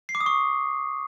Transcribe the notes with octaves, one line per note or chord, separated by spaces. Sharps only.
C7
D6
D#6
C#6